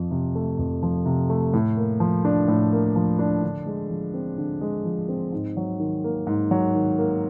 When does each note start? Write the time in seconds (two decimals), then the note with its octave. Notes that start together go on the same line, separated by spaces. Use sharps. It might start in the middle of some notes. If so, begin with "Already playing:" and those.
Already playing: F2 F3
0.11 C3
0.35 A3
0.59 F2
0.83 F3
1.06 C3
1.30 A3
1.54 A2
1.77 A#3
2.00 F3
2.25 D4
2.48 A2
2.72 A#3
2.96 F3
3.19 D4
3.43 D3
3.66 G#3
3.90 F3
4.14 C4
4.38 D3
4.61 G#3
4.85 F3
5.09 C4
5.32 G#2
5.57 F#3
5.80 D#3
6.04 A#3
6.27 G#2
6.51 F#3
6.74 D#3
6.98 A#3